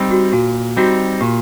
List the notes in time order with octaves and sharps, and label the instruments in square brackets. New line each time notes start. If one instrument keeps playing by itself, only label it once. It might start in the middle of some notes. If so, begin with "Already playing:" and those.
Already playing: [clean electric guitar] G3 C4 D#4
[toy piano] F#4
[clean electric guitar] A#2 [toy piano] F#4
[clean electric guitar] G3 C4 D#4 [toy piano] F#4
[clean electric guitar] A#2 [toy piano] G4